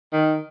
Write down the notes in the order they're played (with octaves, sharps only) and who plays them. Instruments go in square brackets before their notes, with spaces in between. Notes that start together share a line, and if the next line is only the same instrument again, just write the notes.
[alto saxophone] D#3